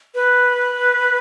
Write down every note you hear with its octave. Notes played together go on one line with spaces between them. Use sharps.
B4